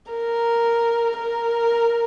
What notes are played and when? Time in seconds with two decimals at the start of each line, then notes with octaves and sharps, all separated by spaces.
0.11 A#4
1.17 A#4